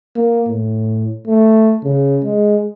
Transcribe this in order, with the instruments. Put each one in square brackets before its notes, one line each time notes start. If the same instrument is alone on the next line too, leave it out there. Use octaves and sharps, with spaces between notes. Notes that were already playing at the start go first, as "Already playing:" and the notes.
[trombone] A#3
A2
A3
C#3
G#3